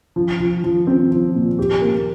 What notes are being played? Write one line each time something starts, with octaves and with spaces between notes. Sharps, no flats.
F3
F3
F3
C4
F3
A#2
G4
A#3